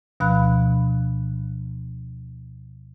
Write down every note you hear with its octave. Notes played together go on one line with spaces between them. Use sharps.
D2 B2 F3 F5 B5 F#6